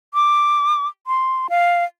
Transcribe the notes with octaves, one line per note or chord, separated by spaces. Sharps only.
D6
C6
F5